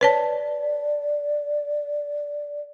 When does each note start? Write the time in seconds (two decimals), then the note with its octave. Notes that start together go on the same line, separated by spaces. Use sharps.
0.01 B4 C#5 D5 A5